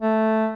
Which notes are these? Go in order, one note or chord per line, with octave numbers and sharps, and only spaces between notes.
A3